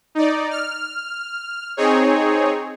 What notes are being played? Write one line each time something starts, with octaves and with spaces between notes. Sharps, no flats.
D#4 D5
F6
C4 D#4 G#4 C#5